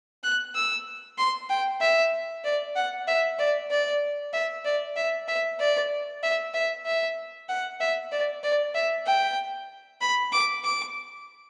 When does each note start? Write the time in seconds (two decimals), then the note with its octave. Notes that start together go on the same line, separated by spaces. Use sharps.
0.24 F#6
0.55 E6
1.18 C6
1.50 G5
1.81 E5
2.44 D5
2.76 F#5
3.08 E5
3.39 D5
3.71 D5
4.33 E5
4.65 D5
4.96 E5
5.28 E5
5.60 D5
6.23 E5
6.54 E5
6.86 E5
7.49 F#5
7.81 E5
8.12 D5
8.44 D5
8.75 E5
9.07 G5
10.01 B5
10.32 D6
10.64 D6